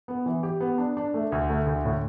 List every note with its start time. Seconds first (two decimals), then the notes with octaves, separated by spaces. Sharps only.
0.08 B3
0.26 E3
0.43 G4
0.60 B3
0.78 D4
0.97 D4
1.14 A3
1.32 D2
1.50 A3
1.66 D2
1.85 A2